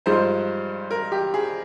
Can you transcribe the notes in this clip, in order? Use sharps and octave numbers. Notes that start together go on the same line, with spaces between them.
G2 F3 G#3 D#4 C5
A#4
G4
G#4